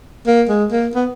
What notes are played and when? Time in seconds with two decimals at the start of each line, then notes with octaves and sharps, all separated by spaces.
0.27 A#3
0.49 G#3
0.72 A#3
0.95 B3